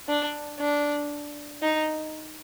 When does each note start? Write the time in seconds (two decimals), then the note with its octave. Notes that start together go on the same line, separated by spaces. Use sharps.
0.09 D4
0.60 D4
1.63 D#4